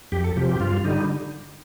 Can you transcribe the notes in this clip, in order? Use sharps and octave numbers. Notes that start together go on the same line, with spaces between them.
F2 G4
A4
C3 F3 G4
G4
G2 F4
D3 G3 D#4